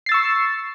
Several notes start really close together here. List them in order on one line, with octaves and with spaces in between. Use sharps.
C7 A6 E6 C#6